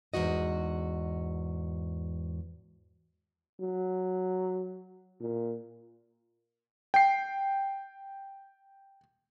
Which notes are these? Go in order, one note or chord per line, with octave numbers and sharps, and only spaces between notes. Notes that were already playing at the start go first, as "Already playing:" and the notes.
E2 G#2 F#4 D#5
F#3
A#2
G5 C7